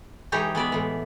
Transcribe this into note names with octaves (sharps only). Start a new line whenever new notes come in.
E3 G#3 D#4 G4 C#5 G5
G#3 B3 D5 E5
A2 E3